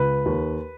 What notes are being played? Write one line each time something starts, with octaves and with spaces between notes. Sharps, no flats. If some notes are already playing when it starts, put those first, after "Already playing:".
Already playing: C#2 B4
D#2